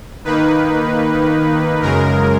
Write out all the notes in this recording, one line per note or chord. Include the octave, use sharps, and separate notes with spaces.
D#3 A#3 D#4 B4
F#2 C#3 G#3 A#4